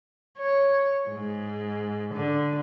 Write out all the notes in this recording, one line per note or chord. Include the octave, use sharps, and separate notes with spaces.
C#5
G#2
D3